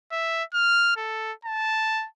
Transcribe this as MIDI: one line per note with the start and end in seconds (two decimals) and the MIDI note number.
0.12 0.43 76
0.54 0.94 89
0.97 1.32 69
1.45 2.07 81